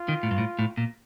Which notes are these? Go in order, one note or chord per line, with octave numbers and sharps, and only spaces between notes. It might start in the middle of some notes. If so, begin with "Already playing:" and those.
Already playing: F4
D#3
A2
G2
A2
A2
A#2